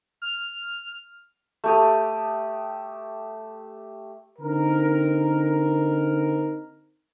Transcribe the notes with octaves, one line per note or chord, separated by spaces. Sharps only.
F6
A3 G4 D#6
D3 C4 D#4 A#4